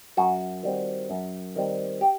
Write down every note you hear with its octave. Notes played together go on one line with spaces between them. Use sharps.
F#2 F#4
D#3 G3 C4
F#2
D#3 G3 C4
G4